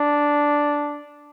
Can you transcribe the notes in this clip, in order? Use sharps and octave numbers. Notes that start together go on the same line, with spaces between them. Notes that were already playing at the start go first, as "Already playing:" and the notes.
Already playing: D4